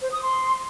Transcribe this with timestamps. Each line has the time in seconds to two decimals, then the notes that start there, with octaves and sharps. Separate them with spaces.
0.02 C5
0.12 D#6
0.23 C6